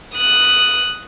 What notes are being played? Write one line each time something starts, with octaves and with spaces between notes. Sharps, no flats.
D#6 F#6